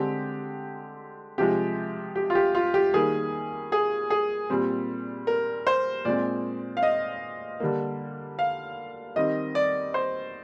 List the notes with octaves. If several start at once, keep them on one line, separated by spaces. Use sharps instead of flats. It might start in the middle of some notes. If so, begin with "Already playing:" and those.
Already playing: D3 G#3 C4 G4
C3 F3 G#3 G4
G4
F4
G4
F4
G4
D#3 G3 A#3 G#4
G#4
G#4
A#2 G3 C4
A#4
C5
A#2 G#3 C4 D5
F5
D#5
D3 G3 A#3
F5
D#3 G3 C4 D#5
D5
C5